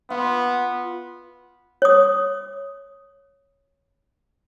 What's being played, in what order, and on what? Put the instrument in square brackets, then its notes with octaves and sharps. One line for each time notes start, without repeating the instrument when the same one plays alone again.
[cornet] B3 [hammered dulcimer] F4
[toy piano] C#5 D#6